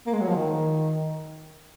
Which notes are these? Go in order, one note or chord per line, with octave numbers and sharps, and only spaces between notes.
A#3
G#3
F#3
F3
D#3